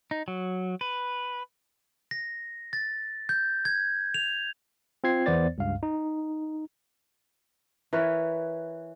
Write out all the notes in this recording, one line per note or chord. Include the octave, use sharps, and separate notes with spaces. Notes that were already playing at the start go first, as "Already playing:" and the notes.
D#4
F#3
B4
A#6
A6
G6
G#6
F7
C4 F4 G#6 C7
E2 E3 B3 C5 D5 A6
C#2 G2 F5
D#4
E3 A#4 B4 C#5